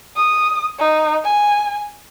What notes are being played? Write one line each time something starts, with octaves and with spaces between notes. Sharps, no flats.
D#6
D#4
G#5